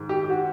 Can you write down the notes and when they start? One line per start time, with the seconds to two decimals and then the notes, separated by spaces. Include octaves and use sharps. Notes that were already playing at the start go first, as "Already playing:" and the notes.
Already playing: G#2 D#3 G#3
0.09 G4
0.24 G4
0.30 F#4